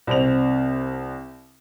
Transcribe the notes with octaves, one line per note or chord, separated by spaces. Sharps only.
C2 C4 F7